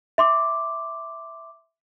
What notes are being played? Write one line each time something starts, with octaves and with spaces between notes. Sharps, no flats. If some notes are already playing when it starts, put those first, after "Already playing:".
E5 C6 D6